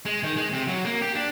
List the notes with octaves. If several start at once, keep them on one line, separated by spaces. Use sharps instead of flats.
G#3
D#3
G#3
C3
F#3
A#3
G4
D4